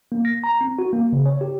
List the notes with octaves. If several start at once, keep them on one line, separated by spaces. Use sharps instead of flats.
A#3
A#6
A#5
C4
F#4
A#3
C#3
C#5
G4